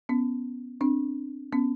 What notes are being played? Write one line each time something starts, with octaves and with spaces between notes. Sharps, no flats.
B3 C#4
C4 D4
B3 C#4